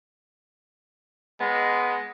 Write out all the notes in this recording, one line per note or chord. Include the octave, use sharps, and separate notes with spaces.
G#3 B3